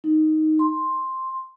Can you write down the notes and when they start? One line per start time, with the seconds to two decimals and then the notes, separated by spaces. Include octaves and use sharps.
0.04 D#4
0.59 C6